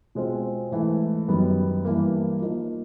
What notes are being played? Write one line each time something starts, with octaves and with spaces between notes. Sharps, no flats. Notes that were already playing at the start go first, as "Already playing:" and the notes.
B2 G#3 C4 F4 G#4
G#2 E3 A3
F#2 D#3 G3 B3
G2 E3 G3 A#3
F3 A#3 D#4